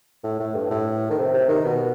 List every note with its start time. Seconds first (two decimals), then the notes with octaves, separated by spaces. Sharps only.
0.24 A2
0.39 A2
0.55 G2
0.70 A2
1.10 D#3
1.18 C3
1.33 C3
1.48 D#3
1.65 B2